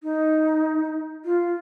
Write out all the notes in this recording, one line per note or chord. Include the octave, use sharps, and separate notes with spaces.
D#4
F4